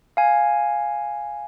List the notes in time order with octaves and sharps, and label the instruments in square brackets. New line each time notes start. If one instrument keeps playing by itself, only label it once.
[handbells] F5 G#5